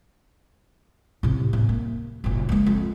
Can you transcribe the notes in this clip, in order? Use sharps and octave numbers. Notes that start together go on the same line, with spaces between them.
A2 C3
E2
A#3
F#1 A#2
G#3 A#3
F2